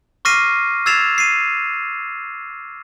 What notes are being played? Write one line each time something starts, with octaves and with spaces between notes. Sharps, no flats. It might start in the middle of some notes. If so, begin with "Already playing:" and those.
C#6 D6 F6 A#6 C7 D#7
E6 G#6 A6 C7 E7 F7
C7 D#7